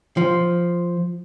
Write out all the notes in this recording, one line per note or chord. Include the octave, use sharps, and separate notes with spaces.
F3